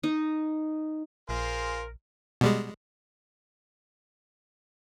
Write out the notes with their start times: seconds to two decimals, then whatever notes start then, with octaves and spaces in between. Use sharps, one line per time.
0.03 D#4
1.29 A#1 F4 G#4 A#4 C5
2.41 B2 G3 G#3